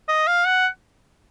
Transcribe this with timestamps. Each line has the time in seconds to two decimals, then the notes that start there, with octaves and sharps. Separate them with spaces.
0.08 D#5
0.28 F5
0.47 F#5